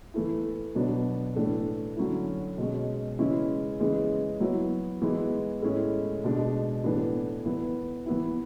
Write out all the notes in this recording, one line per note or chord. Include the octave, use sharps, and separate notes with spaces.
E3 A3 E4
B2 F#3 B3 D4
A2 E3 A3 D4
D3 F#3 C#4 E4
B2 G#3 C#4
C#3 E3 G#3 C#4 E4
C#3 E3 G#3
F#3 B3 E4
E3 G#3 B3 E4
A2 G#3 C#4 E4
B2 G#3 D4
A2 E3 B3 D4
E3 B3 E4
E3 B3 E4